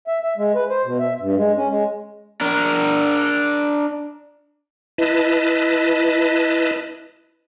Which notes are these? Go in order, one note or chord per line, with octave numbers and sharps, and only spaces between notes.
E5
E5
G#3
B4
C5
B2
E5
G2
G#3
C#4
G#3
D4 A#4
E4 B4 D#5 A5